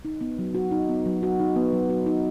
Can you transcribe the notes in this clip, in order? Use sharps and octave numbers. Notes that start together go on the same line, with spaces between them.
D#4
B3
F#3
F#4
D#4
B3
F#3
F#4
D#4
B3
F#3
F#4
D#4